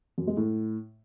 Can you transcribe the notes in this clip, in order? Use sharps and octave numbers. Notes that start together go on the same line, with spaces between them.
F#2
G#3
A2